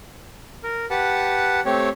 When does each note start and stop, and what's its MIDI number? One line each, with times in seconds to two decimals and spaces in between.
0.64 0.86 70
0.90 1.60 67
0.90 1.60 71
0.90 1.60 78
0.90 1.60 81
1.65 1.89 57
1.65 1.89 60
1.65 1.89 67
1.65 1.89 73